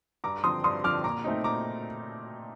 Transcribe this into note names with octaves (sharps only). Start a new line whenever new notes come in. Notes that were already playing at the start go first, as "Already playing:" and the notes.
G2 A#5 D6
D3 F3 C4 C6 D#6
G2 C6 D#6
D3 F3 C4 D6 F6
A#2 A#5 D6
A3 C4 D#4
A#2 A#5 D6